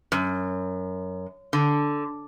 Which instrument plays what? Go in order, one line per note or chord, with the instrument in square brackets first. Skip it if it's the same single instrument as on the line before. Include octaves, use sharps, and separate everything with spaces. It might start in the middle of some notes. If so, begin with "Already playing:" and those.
[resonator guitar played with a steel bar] F#2
D3